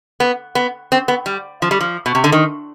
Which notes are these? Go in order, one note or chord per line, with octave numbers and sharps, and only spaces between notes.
B3
B3
C4
B3
G3
F3
G3
F3
B2
C3
D3
D#3